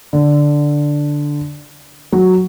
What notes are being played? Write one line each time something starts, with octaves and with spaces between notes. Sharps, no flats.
D3
F#3